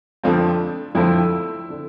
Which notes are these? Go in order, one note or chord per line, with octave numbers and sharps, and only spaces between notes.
F2 D3 F3 A3 C4 D4 F4
F2 D3 F3 A3 C4 E4
D3